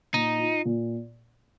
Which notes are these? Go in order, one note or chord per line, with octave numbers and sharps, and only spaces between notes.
A#2 D#4
F4
A#2